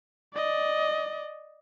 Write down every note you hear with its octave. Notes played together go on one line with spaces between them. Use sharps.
D5 D#5